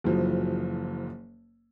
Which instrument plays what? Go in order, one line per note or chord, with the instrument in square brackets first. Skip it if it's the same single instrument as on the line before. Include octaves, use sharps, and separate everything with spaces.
[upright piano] F#1 F#2 E3 F3